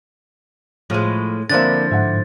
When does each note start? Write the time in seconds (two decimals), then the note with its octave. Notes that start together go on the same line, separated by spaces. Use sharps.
0.90 A2 F3 G#3 F6 D#7
1.50 D3 F3 A#3 C4 D4 E4 A6
1.91 G#2 E5 F#5